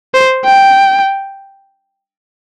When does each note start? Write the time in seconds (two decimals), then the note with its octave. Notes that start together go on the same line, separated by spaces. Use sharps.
0.14 C5
0.45 G5